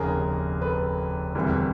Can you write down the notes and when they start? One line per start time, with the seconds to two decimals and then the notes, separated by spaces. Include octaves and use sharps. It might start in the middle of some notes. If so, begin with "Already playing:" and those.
Already playing: F1 D#2 C#3 G#4 A#4
0.62 A4 B4
1.35 E1 D2 C3 E3 G3 G#4 A#4